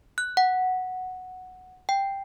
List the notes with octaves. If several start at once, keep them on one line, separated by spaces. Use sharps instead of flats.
F#6
F#5
G5